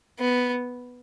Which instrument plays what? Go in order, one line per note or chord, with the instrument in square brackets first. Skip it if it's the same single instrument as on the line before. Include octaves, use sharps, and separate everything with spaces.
[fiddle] B3